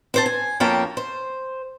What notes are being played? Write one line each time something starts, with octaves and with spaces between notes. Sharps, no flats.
C4 C5 A5
G#5
F2 A#3 C#4 G5 A5
C5